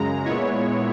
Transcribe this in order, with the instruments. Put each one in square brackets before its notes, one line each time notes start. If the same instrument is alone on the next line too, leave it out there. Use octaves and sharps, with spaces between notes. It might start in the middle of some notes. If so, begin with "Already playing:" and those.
Already playing: [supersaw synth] F#2 C#3 G#3 A#5
A#2 G#3 B3 E4 C#5